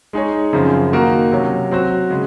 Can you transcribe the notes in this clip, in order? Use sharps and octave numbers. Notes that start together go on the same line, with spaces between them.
G#3 D#4 G#4 C#5
F#2 C#3 F3 C4 F4
D#3 A#3 D#4 F#4 A#4
C3 F#3 C#4
F#3 C4 F#4
C#3 G#3